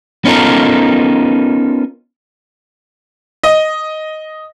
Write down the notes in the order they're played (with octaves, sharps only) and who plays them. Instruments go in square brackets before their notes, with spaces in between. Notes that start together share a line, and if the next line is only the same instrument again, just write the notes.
[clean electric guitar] B3 C#4 D#4 F4 A4 A#4
[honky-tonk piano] D#5